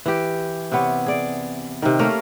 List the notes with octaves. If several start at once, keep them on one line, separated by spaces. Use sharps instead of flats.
E3 G4
C3 B3 C#5
G#4 D5
C3 D#3
A3 A#3 C#4 A#4